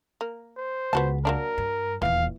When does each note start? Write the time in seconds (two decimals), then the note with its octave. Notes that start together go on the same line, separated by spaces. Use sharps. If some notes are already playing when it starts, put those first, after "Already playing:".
0.21 A#3
0.57 C5
0.93 C#2 B3 F#4 A5
1.25 F#3 A#3 D4 A#4
1.58 G2
2.02 D#1 E2 E3 F5